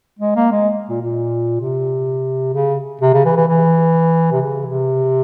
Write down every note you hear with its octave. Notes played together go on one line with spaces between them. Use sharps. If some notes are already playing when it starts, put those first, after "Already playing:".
G#3
A#3
G#3
A#2
A#2
C3
C#3
C3
C#3
E3
E3
E3
C3
C#3
C3